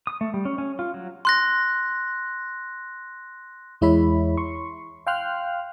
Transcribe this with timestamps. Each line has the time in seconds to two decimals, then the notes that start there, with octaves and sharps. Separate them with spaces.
0.07 D#6
0.21 A3
0.34 G3
0.45 C#4
0.58 C#4
0.79 F4
0.94 F#3
1.25 C6 F#6 A#6
3.81 E2 G#3 E4 C#5 E5 B5
4.37 C6 C#6
5.07 F5 G5 C6 F6 F#6